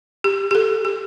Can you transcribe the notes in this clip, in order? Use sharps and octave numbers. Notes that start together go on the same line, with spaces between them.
G4
G4
A4
G4